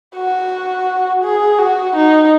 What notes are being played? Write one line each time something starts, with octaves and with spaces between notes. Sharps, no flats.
F#4
G#4
F#4
D#4